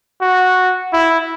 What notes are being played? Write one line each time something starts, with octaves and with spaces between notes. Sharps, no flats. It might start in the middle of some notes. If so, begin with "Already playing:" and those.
F#4
E4